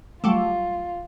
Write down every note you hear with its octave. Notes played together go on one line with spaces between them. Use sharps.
F#3 G3 A3 F4